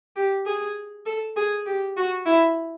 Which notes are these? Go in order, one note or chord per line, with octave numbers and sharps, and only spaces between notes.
G4
G#4
A4
G#4
G4
F#4
E4